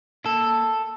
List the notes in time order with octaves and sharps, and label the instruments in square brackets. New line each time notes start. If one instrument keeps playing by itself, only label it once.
[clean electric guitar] A#3 A4